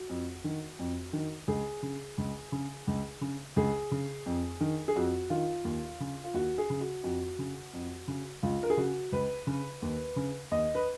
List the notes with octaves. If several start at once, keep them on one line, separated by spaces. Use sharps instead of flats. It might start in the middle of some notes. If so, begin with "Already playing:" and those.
Already playing: F#4
F2
D#3
F2
D#3
C#2 G#4
C#3
C#2
C#3
C#2
C#3
C#2 G#4
C#3
F2
D#3
G#4
F2 F#4
D#3 F4
D#2
C#3
F4
D#2 F#4
G#4
C#3
F#4
F2 F#4
C#3
F2
C#3
C#2 F4
A#4
G#4
C#3 F#4
C#2 B4
C#3
D#2
C#3
D#2 D#5
B4